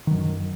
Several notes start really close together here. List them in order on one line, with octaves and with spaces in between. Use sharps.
D#3 F#3 F#2